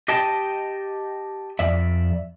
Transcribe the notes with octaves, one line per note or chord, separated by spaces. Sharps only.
G4 D#5 G5 A5
F2 D5 E5